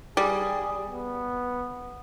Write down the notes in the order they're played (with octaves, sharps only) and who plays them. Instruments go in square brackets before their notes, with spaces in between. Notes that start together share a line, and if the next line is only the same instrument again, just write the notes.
[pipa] G3 [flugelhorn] G#4
[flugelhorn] B3